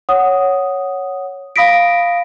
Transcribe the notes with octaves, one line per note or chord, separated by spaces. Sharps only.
C#5 F#5 D#6
F5 B5 D#6 A#6 B6 D7